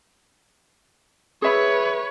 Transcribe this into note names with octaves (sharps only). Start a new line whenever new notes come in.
G#4 B4 C#5 E5 B5